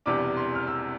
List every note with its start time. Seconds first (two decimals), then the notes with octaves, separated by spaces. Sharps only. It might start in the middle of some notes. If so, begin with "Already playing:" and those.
0.06 E1 E2 C3 G3 D4 D6
0.37 C6
0.55 F6
0.67 E6